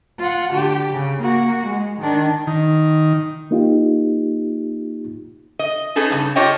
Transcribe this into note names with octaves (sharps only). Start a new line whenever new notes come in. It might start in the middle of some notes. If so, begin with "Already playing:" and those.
F4 F#5
D3 G4
C#3
A#3 F#4
G#3
D#3 D4
D#3
A#3 D#4 F4 G4
D#5
C#4 D#4 G#4 A4 B4
G2 C#3
F4 G4 A4 C#5 D#5 G5